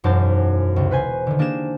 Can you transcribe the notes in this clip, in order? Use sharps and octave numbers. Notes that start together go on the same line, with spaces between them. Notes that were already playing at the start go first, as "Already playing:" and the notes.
E1 F#2 D#4 C5 A5 D6
C#2 C3
B4 C5 G#5
D3 D#3
A#3 D4 G4 G#4 E7